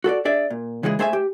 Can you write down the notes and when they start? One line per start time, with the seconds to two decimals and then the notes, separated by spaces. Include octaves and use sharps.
0.04 F#4 A4 B4 D5
0.25 D4 G#4 D5 E5
0.50 A#2
0.83 C#3 E3 G#3 E4 F#4 G#4
0.99 A3 G#4 C5 E5 F5 G#5
1.13 G4